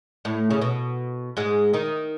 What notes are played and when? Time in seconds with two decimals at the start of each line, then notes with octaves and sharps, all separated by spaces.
0.25 A2
0.51 C#3
0.62 B2
1.37 G#2 G#3
1.73 D#3 D#4